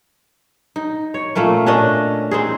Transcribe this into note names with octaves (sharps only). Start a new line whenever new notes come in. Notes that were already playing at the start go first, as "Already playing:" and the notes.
D#4
C#5
A#2 A3 A#3 C#4
C#4 D4 D#5
C4 D#4 G#4